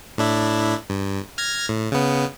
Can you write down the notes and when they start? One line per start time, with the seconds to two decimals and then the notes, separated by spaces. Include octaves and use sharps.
0.18 A2 D4 E4
0.90 G2
1.38 F6 G#6 A#6
1.69 A2
1.92 C#3 B3